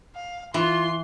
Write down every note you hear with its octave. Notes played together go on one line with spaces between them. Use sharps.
F5
E3 F4 C6